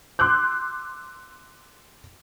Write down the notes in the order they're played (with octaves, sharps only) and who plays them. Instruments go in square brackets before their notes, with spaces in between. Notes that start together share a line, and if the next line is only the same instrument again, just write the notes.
[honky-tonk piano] C6 D6 E6 F#6 G6